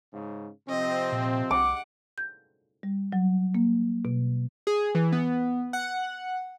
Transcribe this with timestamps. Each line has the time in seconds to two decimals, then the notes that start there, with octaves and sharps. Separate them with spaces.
0.14 G#2 C#3
0.69 C3 F3 C4 D#5
1.12 A#2
1.51 C2 F#5 D6
2.18 G6
2.83 G3
3.12 F#3
3.55 A#3
4.05 B2
4.67 G#4
4.95 E3
5.12 B3
5.73 F#5